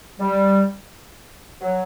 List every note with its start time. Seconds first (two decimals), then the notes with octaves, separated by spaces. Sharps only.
0.20 G3
1.61 F#3